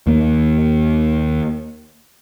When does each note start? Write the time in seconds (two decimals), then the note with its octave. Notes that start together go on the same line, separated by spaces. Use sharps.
0.07 D#2 A#3